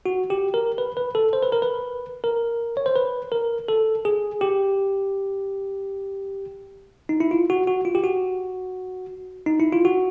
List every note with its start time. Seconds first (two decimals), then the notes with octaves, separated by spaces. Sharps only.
0.06 F#4
0.30 G4
0.54 A#4
0.78 B4
0.97 B4
1.15 A4
1.33 C5
1.43 B4
1.52 A#4
1.62 B4
2.24 A#4
2.77 C#5
2.86 C5
2.96 B4
3.32 A#4
3.68 A4
4.05 G#4
4.41 G4
7.09 D#4
7.20 E4
7.31 F4
7.50 F#4
7.67 F#4
7.85 F4
7.95 G4
8.04 F#4
9.46 D#4
9.60 E4
9.72 F4
9.85 F#4